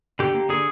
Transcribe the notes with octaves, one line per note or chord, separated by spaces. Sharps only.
D3 G4
A#3
D3 G#4